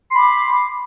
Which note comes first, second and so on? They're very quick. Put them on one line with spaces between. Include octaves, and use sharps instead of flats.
C6 B5 D6